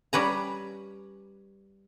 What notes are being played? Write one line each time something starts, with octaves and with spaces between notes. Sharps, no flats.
G3 C#4 B4 A#5